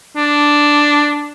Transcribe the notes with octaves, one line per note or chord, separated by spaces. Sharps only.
D4